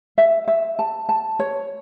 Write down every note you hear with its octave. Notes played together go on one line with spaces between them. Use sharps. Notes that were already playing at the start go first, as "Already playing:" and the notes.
E5
E5
A5
A5
C#5